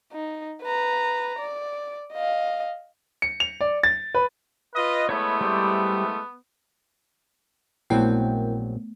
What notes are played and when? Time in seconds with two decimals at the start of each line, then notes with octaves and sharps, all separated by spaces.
0.12 D#4
0.62 B4 A#5
1.39 D5
2.13 D#5 F5
3.22 C#7
3.40 F7
3.61 D5
3.83 A6
4.14 B4
4.75 F4 B4 D#5
5.09 G#3 A3 B3 E4 C#5 B5
5.41 G3 C5 D5
7.90 A#1 F#3 A3 B3 C4 E4 A#4 G5